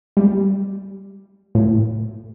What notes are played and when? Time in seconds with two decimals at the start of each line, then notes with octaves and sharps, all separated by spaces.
0.17 G3
1.55 A2